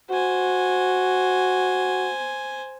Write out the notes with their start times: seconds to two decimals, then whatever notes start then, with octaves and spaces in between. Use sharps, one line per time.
0.10 F#4 C5 G#5